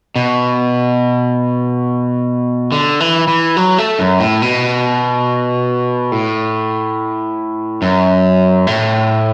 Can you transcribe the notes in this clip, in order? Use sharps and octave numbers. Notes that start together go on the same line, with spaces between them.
B2
D3
E3
E3
F#3
A3
F#2
A2
B2
A2
F#2
A2